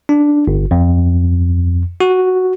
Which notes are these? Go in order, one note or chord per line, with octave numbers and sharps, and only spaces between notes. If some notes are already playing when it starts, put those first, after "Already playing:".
D4
G1
F2
F#4